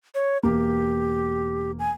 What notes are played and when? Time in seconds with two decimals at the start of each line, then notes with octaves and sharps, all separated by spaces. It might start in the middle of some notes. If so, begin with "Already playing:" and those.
0.15 C#5
0.43 E1 A#3 G4
1.79 G#5